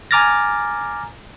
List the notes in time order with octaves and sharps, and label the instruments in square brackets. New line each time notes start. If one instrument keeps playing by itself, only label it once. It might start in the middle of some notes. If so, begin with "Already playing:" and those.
[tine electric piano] G#5 A#5 D6 F6 A6 A#6